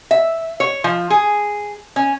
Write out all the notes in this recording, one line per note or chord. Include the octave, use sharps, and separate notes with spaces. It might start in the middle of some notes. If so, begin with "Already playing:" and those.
E5
C#5
F3
G#4
C#4